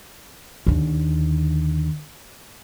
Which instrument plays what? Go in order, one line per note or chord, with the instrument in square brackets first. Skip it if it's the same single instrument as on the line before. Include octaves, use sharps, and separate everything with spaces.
[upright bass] D#2 D3